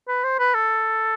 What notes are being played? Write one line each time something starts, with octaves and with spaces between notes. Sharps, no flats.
B4
C5
B4
A4